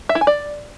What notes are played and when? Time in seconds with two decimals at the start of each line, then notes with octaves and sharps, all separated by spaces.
0.09 E5
0.15 E4
0.21 G#5
0.27 D5